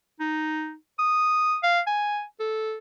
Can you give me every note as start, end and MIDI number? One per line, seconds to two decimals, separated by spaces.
0.20 0.74 63
0.99 1.57 87
1.63 1.81 77
1.87 2.23 80
2.40 2.78 69